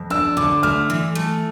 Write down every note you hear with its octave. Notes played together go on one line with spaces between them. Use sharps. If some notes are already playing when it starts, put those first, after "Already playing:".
Already playing: F2
D4 E6
D3 D6
A3 F6
E3
A3